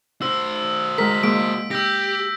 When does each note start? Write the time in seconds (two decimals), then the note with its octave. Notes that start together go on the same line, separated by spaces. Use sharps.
0.22 F#4 C5 E6
0.98 G#3 A#4 B6
1.23 G#3 A#3 D7
1.71 G4 E6 G6 A#6